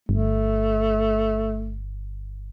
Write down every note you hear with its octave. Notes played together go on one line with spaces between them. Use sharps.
G1 A3